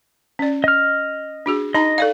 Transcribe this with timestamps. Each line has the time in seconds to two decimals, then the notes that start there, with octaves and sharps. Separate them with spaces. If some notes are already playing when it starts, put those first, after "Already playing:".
0.39 C#4 D5
0.64 D#5 F6
1.46 D4 F#4 G#4
1.74 D#4 D#5 A5 A#5
1.98 A4 D5 F5